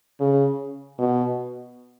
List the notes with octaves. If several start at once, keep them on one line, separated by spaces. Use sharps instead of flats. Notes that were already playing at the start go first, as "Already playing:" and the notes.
C#3
B2